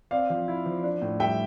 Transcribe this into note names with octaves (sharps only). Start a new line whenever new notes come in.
C4 D5 F5
F3
E4
F3
D4
A2
G3 E5 G5